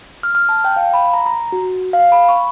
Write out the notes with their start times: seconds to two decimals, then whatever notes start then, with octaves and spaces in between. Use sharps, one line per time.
0.23 F6
0.35 F6
0.49 A5
0.65 G5
0.76 F5
0.94 B5
1.14 A#5
1.26 A#5
1.52 F#4
1.93 F5
2.12 B5
2.29 C#6